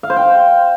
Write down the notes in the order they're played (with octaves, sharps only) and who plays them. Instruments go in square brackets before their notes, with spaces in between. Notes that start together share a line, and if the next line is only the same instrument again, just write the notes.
[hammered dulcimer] F5
C5
G5